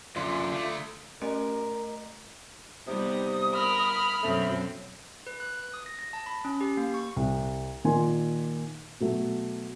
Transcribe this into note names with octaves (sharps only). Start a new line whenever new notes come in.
F#2 D3 F4
D3 A3
A3 C#4 A#4 D#5
C3 G3 B3 D#4 D#6
A#4 B5 F6
F#2 B2 A3 C4
B4
F#6
D#6
A#6
A#6
A5
B5
C#4
G4
A#3
C#6
C2
A#2 D#3 A#4 G#5 C6
B2 F#3 A3